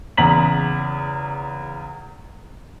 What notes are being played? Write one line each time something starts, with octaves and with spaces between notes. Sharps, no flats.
E2 C#3 A#5 B6 F#7